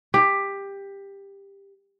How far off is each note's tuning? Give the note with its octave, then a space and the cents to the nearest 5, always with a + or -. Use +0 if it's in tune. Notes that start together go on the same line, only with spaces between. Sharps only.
G4 +15